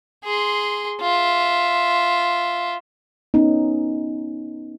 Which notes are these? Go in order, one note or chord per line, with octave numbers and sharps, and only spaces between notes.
G#4 C6
F4 E5
B3 C#4 D#4